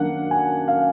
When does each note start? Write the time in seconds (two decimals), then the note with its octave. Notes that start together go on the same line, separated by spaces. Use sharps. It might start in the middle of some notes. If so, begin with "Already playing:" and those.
Already playing: F#2 D#3 A#3 D4 F#5
0.31 G#5
0.68 F5